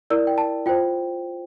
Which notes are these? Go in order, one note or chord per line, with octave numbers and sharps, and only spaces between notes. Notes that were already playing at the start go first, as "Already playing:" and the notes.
E4 A#4 D5 E6
G5
A5
F4 C5 G5